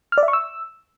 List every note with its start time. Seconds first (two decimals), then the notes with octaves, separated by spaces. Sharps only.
0.12 F6
0.18 D5
0.23 E5
0.28 C#6
0.33 E6